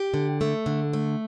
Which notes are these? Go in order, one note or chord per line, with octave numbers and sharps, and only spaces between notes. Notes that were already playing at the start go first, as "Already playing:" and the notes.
Already playing: G4
D3
A3
D3
A3